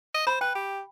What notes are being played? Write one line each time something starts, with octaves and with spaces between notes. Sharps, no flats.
D#5
C5 B5
B4 G5
G4